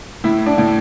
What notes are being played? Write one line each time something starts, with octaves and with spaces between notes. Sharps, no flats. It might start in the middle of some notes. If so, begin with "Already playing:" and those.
A2 E4
D4
A2